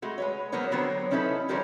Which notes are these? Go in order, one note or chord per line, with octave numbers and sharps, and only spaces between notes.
G#3 A3 F#4
G#3 B4 C#5
F#3 A#3 B3 A#4 C5 C#5
D3 F#3 B3 C5 C#5 G5
E3 C#4 D#4 E4 A4 B4
D3 F3 G3 A#4 C5 C#5